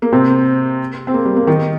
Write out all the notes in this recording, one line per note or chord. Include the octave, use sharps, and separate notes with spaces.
A#3
C3 C4
C4
A#3
G3
A#3
D#3 D#4